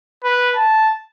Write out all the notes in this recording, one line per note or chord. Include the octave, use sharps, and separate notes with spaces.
B4
A5